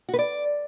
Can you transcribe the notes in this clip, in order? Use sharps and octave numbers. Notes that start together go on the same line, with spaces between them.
F#4
B4
D5